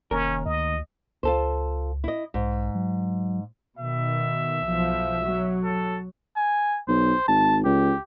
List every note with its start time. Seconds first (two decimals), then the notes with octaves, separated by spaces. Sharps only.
0.11 F1 D#2 C#4 A#4
0.46 D2 D#5
1.23 C#2 F4 A4 C5
2.04 E4 D#5
2.34 B1 G#2
2.75 F#3
3.79 B2 D#3 E5
4.66 B1 F3
5.26 F#3
5.64 A4
6.36 G#5
6.88 B1 C5
7.28 G#1 A5
7.65 C#2 G4